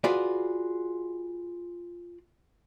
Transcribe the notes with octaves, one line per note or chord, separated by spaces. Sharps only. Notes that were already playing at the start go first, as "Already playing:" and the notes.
F4 F#4 G#4 B4 D5